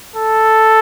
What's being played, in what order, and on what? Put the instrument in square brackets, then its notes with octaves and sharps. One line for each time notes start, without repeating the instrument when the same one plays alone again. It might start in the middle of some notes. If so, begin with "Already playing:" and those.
[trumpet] A4